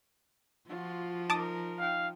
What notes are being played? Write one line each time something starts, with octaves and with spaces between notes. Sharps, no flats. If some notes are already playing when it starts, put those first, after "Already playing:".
F3 F4 F#4
D#4 A#4 A5 D6 D#6
D#4 F5 G5